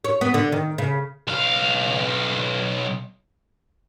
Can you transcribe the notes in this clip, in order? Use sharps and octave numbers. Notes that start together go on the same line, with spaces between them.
C#5
B3
D3
D#3
C#3
B1 F5